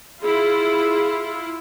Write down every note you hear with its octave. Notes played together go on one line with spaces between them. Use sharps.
E4 F4 G#4